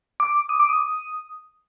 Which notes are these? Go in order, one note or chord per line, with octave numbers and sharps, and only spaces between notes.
D6
D#6
D6
D#6